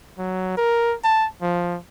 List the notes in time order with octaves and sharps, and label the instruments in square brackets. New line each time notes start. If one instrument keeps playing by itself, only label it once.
[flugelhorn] F#3
A#4
A5
F3